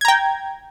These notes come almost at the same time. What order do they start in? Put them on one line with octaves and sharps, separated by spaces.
G#6 A#5 G5